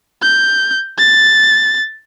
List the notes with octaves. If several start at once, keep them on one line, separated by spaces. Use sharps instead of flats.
G6
A6